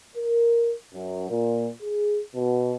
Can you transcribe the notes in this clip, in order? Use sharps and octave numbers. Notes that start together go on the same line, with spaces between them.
A#4
F#2
A#2
G#4
B2